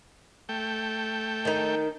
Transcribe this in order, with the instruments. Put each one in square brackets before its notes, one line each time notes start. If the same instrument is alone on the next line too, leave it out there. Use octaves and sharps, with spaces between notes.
[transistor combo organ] A3 G5
[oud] D#3 D#4